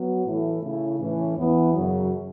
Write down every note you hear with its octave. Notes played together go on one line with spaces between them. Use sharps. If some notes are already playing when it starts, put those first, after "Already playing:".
Already playing: F#3 B3 F#4
A2 E3 A3 E4 A4
C#3 A3 C#4 E4
A2 E3 C#4
E2 E3 B3
F#2 C#3 F#3